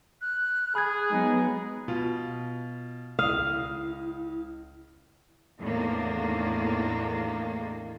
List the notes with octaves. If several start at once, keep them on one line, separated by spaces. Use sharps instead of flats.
F6 F#6
G#4 B5 G#6
F#3 G#3 B3 D#4
B2 F4
C#2 E4 F5 D#6
E2 A2 D#3 A#3 D4